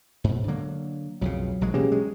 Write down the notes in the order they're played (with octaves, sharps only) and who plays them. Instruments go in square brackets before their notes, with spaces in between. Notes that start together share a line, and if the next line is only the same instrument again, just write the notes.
[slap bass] G#2 B2
D3 F#3 A#3
[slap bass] B1 F2 C#3 [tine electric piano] F#3
[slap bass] A#1 F#3 G#3
[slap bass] B2 E3 A#3 [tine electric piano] C#4 G4 G#4
[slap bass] F#3 G#3